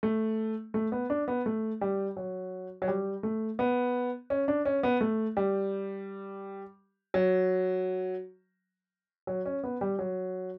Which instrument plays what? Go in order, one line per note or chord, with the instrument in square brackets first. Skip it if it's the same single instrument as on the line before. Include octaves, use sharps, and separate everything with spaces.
[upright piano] A3
A3
B3
D4
B3
A3
G3
F#3
F#3
G3
A3
B3
C#4
D4
C#4
B3
A3
G3
F#3
F#3
C#4
B3
G3
F#3